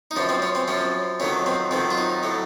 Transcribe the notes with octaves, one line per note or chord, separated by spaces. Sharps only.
D#4
F#2 F3 C#4
C4
C#4
C4
F#2 F3 C#4
F2 D#3 F#3 C#4
C4
F2 D#3 F#3 C4
F4
D#4
A2 F#3